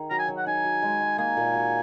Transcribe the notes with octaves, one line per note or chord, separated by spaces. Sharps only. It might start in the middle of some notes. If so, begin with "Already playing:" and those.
Already playing: D#3 G#4
F#3 A#5
G#5
F#3
F#5
D#4 G#5
F#4
G#3
G#3
A#3 G#5
A#2
F#4